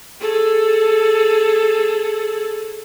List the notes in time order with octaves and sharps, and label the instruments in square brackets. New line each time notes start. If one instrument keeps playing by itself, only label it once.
[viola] G#4 A4